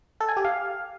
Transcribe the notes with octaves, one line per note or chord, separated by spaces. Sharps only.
A4
G#5
G4
F5